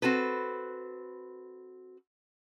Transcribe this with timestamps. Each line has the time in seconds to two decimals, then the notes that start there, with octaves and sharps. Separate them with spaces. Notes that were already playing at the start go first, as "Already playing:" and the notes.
0.02 C4 F#4 A4 B4